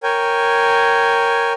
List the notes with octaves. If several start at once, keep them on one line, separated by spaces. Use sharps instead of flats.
A#4 C#5 G5 G#5